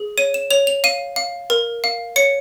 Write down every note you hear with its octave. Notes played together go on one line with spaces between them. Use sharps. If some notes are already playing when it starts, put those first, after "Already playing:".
Already playing: G#4
C#5 D#7
E7
C#5 F7
F7
F5 D#7
F5
A#4
F5
C#5 C#7